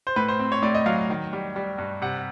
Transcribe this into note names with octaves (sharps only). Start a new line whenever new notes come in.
C5
A2 B4
C5
C4
C#5
A2 D5
D#5
F#3 F5
D#3
G3
G3
G2
C3 F#5